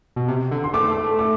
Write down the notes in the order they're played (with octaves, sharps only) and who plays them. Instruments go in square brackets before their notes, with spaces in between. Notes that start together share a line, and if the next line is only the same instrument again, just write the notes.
[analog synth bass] B2
C3
D3
[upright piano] C6
[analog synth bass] A3 [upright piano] D6
[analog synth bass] A3
A3
[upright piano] D6